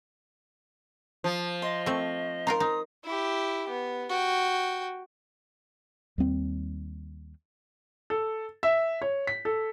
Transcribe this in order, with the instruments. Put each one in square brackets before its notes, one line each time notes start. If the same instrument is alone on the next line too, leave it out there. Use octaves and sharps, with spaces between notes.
[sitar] F3
[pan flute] D#5 [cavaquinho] C6
[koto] A3 C4 [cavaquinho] C#6
[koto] D#4 F4 A#4 [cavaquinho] A#5 C6
[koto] D#4 [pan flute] D#6
[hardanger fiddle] E4 G4
B3
F#4 G5
[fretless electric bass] D#2 G3 C4
[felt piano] A4
E5
C#5
B6
A4